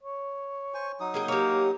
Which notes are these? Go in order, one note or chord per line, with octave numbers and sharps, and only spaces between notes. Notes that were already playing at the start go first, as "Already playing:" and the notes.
C#5
C5 G#5 C#6
F#3 D#4 D#6
A#3 G#4 G5
A#3 G4 C#5